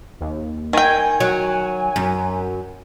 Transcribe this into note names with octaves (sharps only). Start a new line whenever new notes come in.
D#2
D#3 G5 G#5
F#3
F#2